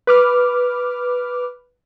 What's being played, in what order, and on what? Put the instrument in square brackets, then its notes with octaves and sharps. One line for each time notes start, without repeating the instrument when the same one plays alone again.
[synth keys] B4 D6 F6